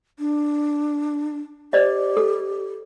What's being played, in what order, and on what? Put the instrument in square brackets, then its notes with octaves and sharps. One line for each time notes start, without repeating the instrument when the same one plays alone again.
[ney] D4
[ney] G4 [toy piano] C5 D5 D#5
[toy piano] A4